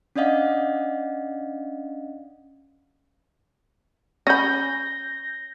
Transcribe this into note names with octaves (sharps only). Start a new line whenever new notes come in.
C#4 D4 D5 D#5 F5 F#5
C#4 B5 G6 A#6